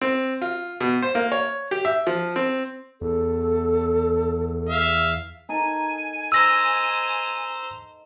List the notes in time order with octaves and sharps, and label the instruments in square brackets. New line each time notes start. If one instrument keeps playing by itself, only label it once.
[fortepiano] C4
F4
B2
C5
A#3
C#5
G4
E5
F3
C4
[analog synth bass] E2 [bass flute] A4
[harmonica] E5 F5
[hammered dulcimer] D#4 A4 A#4 [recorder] G#5
[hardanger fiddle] C5 A#5 [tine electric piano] E6 A#6